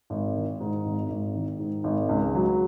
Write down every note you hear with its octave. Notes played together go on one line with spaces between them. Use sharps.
G#1
D#3
G#2
G#1
G#1
D#3
G#2
G#1
C#2
F#3